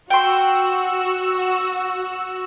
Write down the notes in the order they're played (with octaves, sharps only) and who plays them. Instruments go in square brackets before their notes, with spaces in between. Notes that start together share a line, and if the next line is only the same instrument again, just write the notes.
[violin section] F#4 E6 [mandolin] G5 C6